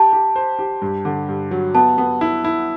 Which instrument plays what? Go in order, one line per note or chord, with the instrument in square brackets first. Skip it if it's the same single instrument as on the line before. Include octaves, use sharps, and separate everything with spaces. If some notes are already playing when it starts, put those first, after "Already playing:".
Already playing: [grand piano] G4 [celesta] A5
[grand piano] G4
C5
G4
G2
D3
G2
F#3
[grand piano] B3 [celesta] A5
[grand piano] B3
E4
E4